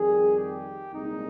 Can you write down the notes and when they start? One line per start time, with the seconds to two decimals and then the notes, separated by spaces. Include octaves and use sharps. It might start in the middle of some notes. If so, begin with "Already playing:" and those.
Already playing: F2 D#3 G3 G#4
0.36 G4
0.92 C2 A#2 G#3 D#4